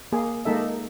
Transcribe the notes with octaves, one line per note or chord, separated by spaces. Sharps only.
A#3 G#4
G#3 A#3 D#4 A4 E5